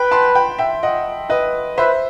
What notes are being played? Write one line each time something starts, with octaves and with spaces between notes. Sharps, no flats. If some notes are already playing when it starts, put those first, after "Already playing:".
Already playing: B4 G5 B5
A5 C6
G5 B5
E5 G5
D#5 F#5
B4 D#5
B4 C5 E5